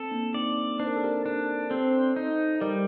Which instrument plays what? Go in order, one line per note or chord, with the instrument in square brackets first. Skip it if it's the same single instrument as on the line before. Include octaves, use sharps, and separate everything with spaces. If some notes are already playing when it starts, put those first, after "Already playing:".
Already playing: [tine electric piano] C4 [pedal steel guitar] A4
[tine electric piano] A#3 D4
[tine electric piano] C4 D#4 [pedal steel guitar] D5
[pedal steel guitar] D4 [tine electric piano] C5
[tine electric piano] A#4
A4
G4 A#4
[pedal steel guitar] D4
[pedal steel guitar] C4 [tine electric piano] A4 C5
[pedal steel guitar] D#4
[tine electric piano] D#5
[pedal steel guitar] G3 [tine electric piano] A#4 D5